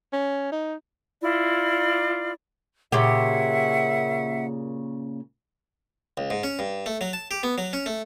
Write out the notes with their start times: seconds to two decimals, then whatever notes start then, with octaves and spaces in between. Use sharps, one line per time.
0.13 C#4
0.52 D#4
1.21 E4 F4 D5
2.92 A#2 C#3 G4 E5 F#5
6.17 C#2
6.30 G#2
6.43 C#4
6.59 G2
6.86 A3
7.01 F#3
7.13 A5
7.31 G4
7.43 B3
7.58 F#3
7.73 C#4
7.86 A3